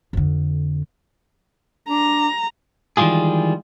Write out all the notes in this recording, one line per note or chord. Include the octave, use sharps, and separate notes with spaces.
F2 D3
D4 A#5
D#3 E3 G3 G#3 F4 G#4